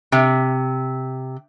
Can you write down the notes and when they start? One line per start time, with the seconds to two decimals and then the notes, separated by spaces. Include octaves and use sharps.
0.12 C3